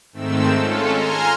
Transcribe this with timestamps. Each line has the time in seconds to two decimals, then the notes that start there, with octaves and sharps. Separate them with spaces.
0.13 G#2 D#3 A3 C4 E6
0.54 G#3 C#4 F4 A4
0.90 G#5 A#5 C6 F6